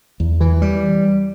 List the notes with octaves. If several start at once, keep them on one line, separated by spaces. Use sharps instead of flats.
E2
E3
G3